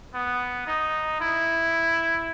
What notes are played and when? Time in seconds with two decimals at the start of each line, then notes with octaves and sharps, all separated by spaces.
0.14 B3
0.67 D#4
1.21 E4